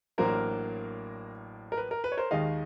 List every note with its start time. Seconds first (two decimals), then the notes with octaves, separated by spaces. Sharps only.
0.18 A1 A2 F#3 A#3 D4 A#4 C5
1.72 A#4
1.78 B4
1.91 A#4
2.04 B4
2.12 C#5
2.17 A#4 C5
2.31 D#2 D#3 G#3 D#5 F5